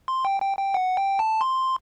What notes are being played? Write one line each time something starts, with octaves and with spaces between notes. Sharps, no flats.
C6
G5
G5
G5
F#5
G5
A5
C6